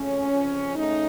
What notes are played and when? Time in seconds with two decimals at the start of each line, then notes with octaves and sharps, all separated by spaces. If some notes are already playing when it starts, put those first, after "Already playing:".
Already playing: F2 C#3 A3 C#4
0.30 F2 C#3 F3
0.75 C#3 A3 C#4 D#4